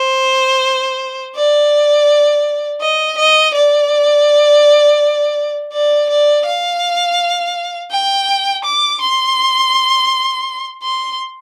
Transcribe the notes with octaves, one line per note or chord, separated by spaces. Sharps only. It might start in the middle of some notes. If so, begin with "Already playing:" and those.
Already playing: C5
D5
D#5
D#5
D5
D5
D5
F5
G5
D6
C6
C6